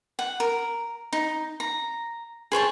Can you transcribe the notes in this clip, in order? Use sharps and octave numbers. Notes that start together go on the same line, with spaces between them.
F#5
A#4
D#4
A#5
G#4 C5 C#5 A5